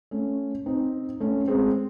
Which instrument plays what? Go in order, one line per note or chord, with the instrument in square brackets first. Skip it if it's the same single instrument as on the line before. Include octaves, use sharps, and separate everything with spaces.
[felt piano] A3 C#4
C4 D#4
A3 C#4
G#3 C4